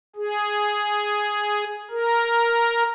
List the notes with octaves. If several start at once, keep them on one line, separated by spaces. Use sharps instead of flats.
G#4
A#4